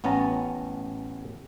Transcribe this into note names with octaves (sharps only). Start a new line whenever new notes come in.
A1 B3 C#4 A5 A#5